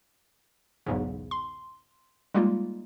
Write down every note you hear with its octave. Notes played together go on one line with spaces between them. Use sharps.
B1 E2 G#2 C#3
C6
G3 G#3 A#3 D#4 F4